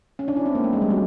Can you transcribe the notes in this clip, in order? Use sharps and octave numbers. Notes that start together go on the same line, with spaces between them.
C#4
D4
E4
C4
A#3
A3
G#3
G3
F#3